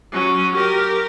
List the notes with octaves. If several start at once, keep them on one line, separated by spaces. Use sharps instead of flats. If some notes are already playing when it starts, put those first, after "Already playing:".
F#3 C#4
G4 A#4